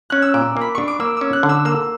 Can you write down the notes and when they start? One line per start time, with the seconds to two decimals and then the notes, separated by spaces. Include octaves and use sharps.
0.10 C#4 F#6
0.22 E6
0.34 A#2 D6
0.57 A#3 B5
0.75 D4 C#6
0.88 D6
1.00 A#3 E6
1.17 C#4 E6
1.33 F#6
1.43 D3
1.49 E6
1.65 A#3 E6